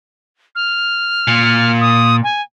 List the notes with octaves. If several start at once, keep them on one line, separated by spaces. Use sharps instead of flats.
F6
A#2
D#6
G#5